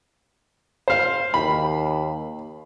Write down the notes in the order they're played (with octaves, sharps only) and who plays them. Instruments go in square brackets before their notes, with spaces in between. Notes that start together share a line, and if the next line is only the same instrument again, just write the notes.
[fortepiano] C5 F5
[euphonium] D#2 [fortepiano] B5